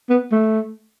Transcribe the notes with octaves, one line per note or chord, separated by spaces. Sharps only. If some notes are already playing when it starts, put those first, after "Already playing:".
B3
A3